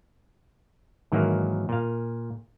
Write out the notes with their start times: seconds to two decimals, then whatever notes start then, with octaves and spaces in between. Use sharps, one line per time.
1.12 G#2 D#3 E3 F#3 A#3
1.69 A#2 F5